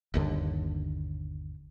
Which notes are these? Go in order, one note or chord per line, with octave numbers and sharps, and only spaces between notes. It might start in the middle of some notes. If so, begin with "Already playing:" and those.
G1 D#2 D3